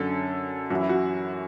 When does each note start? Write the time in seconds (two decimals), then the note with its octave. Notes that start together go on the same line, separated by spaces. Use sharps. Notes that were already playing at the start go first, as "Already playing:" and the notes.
Already playing: F#2 D3 A4
0.70 F#2 E3 F#4
0.81 E4
0.89 F#4